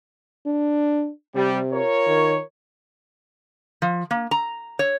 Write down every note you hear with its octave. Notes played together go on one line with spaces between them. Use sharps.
D4
C3 G3
F4 A#4 C#5
D#3
F3
A#3
A#5
C#5